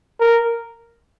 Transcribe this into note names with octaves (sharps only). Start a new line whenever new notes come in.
A#4